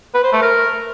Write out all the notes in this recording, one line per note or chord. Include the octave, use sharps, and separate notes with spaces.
B4
C5
A3
A#4